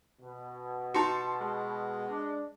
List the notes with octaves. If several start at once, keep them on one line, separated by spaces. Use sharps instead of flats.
B2
D#4 F#4 A5 C6 C#7
G#3
D4